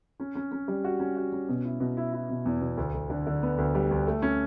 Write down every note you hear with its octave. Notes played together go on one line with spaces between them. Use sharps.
C#4
C#4
C#4
G3
F#4
C#4
F#4
C#4
B2
E4
B2
E4
E4
B2
E2
B2
D2
D2
D3
D3
B3
D2
G3
D2
A3
C#4